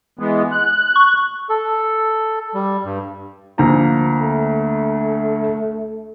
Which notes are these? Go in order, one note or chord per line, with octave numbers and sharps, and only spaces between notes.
E3 G#3 B3
F#6
C#6
A4
G3
G2
D2 F3 A#3 A#5
A3